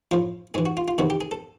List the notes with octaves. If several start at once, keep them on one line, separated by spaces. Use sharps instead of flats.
A2 F3 F4
G#2 E3 G#4
F#4
F4
F4
E2 C3 D#3 F#4
G4
G#4
A4